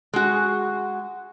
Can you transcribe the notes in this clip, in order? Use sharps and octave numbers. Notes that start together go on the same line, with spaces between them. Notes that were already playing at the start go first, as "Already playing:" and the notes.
G#3 F#4